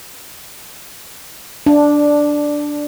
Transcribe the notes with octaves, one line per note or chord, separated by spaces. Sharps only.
D4